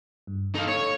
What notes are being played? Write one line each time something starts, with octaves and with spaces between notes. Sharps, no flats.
G2
D#4 A4 F5
C#5